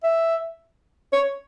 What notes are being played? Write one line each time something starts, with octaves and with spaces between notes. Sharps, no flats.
E5
C#5